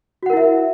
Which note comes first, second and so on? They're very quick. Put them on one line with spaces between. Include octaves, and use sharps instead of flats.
F#4 F#5 A#4 E4 E5